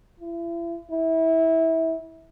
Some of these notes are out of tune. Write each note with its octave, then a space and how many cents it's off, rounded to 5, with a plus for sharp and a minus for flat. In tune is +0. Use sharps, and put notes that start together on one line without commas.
E4 +40
E4 -20